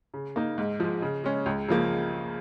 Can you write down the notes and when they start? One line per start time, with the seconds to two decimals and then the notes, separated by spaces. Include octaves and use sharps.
0.14 C#3
0.36 A#3 D#4
0.58 G#2
0.80 F3 G#3
1.02 C#3
1.24 G#3 C#4
1.46 C#2
1.68 C#3 F3 A#3